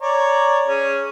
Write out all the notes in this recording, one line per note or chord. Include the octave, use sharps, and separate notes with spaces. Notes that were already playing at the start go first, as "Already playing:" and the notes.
C#5 D5 A#5
C#4 G#4 C#5